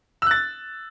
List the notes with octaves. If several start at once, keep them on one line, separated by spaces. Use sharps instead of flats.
E6 F#6 A6